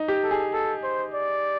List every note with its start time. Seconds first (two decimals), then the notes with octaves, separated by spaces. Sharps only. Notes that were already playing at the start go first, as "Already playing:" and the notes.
Already playing: D#4
0.08 G4
0.23 A4
0.31 G#4
0.53 A4
0.83 C5
1.14 D5